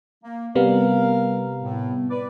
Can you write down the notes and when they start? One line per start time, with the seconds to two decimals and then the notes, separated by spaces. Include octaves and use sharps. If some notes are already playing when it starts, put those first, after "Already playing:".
0.23 A#3
0.55 C3 G3 B3 A#4 F5
1.62 A2
2.10 B4 D5